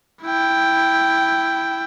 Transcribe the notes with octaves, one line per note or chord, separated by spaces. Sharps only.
E4 G5